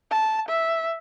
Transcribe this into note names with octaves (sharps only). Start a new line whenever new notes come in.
A5
E5